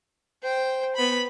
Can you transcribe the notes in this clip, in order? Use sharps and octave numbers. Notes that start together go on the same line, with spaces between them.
C5 G5
B3 B5